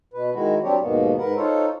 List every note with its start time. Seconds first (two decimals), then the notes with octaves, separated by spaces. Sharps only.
0.14 B2 B4
0.34 D#3 G#3 E4 F#4
0.63 F#3 G3 C4 D4 G4 C#5
0.81 D#2 G#2 B2 A#3 B3
1.18 G#2 A#4 B4 F#5
1.37 D#4 F4 A4 C5 C#5